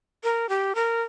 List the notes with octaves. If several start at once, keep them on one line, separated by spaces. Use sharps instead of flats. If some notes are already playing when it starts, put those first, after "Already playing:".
A#4
G4
A#4